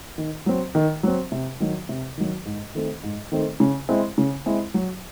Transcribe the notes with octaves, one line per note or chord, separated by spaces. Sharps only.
D#3
F#3 C4
D#3
F#3 C4
C3
D#3 F#3
C3
D#3 F#3
G#2
D#3 A3 C4
G#2
D#3 A3 C4
C#3
G#3 C4 E4
C#3
G#3 C4 E4
F#3